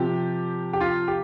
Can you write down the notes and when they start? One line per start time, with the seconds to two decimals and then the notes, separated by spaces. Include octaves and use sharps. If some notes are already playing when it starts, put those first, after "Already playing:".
Already playing: C3 F3 G4
0.73 G4
0.80 F4
1.08 G4